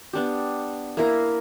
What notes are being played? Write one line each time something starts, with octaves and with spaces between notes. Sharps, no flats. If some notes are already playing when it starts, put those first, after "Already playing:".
B3 D4 G4
A#3 E4 A#4